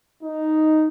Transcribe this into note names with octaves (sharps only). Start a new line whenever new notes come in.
D#4